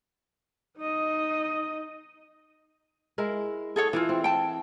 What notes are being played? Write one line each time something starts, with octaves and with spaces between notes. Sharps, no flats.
D#4 D#5
G#3 E4 A#4
G#4 A4 C#5
E3 D4 E4 F4
C4
G5 A5